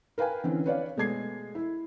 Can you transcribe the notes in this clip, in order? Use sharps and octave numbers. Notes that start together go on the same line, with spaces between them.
A#4 B4 F5 G5 G#5
D3 E3 C4 C#4
B4 C#5 D5 F5
B2 G#3 A3 G#6 C7
E4